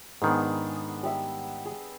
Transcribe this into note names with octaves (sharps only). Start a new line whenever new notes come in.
G#2 D#3 B3 D4 G#4
G3 E5
G#4